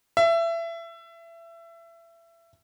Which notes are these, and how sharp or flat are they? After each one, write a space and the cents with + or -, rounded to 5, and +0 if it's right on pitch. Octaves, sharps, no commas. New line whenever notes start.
E5 +25